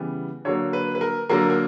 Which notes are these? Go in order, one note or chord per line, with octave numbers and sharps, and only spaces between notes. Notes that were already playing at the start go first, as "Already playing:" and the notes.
Already playing: C#3 E3 G3 B3
D3 F#3 A#3 C#5
B4
B4
A#4
D3 F#3 A#3 A#4
A#4